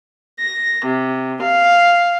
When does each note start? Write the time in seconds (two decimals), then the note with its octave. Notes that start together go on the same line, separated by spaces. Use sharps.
0.40 A#6
0.84 C3
1.42 F5